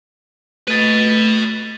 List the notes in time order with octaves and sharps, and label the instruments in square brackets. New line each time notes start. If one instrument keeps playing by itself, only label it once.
[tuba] A3 [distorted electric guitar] B4 D#5 [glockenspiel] A6 D#7